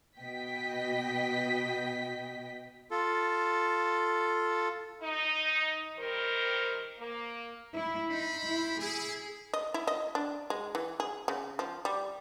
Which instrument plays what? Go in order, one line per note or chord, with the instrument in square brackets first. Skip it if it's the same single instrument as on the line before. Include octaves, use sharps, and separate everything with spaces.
[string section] B2 B3 D#5 G5 B6
[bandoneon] F4 A4
[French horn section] D#4
D#3 G3 A#4 C5
A#3
[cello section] E4
[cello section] D#4 [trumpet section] C5 B5
[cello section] E4
[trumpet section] E4 [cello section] G#4
[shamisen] D#5
E4
D#5
D4
G#3
E3
G#4
C#3
F3
G3